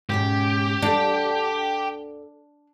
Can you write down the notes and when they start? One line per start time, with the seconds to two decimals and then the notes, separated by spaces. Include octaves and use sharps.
0.10 G#2 B2 C#4 G4
0.82 D4 A4 D5 F#5